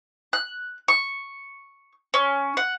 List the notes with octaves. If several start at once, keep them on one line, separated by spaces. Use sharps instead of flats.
F#6
C#6
C#4
F#5